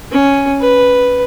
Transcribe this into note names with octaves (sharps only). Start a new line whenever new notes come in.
C#4
B4